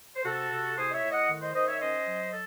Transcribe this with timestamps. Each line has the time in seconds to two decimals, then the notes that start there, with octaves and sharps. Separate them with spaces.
0.15 C5
0.24 C3 F#4 A4
0.50 C3
0.76 A2 G#4 C5
0.88 D#5
0.93 C#5 E5
1.02 A2
1.10 D#5 F#5
1.27 D#3
1.41 C5 D#5
1.54 D#3 C5 D#5
1.67 C#5 E5
1.79 C#4 C5 D#5
2.06 F#3
2.31 A4